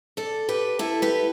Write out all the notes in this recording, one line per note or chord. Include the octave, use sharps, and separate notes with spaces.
A4 D5
G4 B4
E4 A4
G4 B4